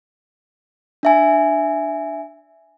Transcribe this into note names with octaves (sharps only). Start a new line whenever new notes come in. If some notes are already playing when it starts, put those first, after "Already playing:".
D4 E5 G#5